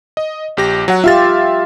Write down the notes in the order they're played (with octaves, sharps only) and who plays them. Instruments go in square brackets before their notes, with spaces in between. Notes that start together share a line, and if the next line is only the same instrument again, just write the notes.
[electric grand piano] D#5
A#1 G4 A#6
F#3 F#5
[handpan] F4 G4 [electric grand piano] E5 F5 A6